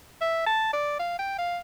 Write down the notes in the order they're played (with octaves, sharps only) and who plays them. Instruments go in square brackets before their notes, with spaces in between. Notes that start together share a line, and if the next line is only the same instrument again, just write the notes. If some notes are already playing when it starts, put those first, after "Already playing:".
[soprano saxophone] E5
A5
D5
F5
G5
F5